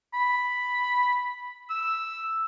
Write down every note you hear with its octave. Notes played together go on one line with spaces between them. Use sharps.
B5
E6